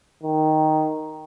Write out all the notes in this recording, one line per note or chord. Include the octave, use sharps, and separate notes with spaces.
D#3